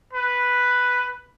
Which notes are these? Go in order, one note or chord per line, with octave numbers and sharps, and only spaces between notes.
B4